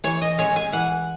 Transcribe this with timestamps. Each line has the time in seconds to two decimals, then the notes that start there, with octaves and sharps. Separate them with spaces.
0.04 E3 C#5
0.21 D#5
0.38 G#3 C#4 C#5
0.56 G#5
0.72 E3 F#5